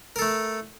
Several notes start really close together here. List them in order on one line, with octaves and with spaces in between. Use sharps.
A#4 A4 A3